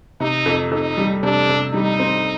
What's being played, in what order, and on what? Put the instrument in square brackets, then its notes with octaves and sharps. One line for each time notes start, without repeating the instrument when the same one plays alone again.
[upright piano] C3 [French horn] D#4
[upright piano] F2
[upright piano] F2 [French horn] D#4
[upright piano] G3
[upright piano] C3 [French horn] D4
[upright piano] C3
[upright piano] G3 [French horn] D#4
[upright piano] C4